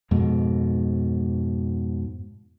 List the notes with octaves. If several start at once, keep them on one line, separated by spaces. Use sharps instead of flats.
F2 G#2 B2